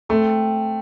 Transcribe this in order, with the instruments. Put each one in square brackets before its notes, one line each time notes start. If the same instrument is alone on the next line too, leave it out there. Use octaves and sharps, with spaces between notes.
[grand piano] A3 [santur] C4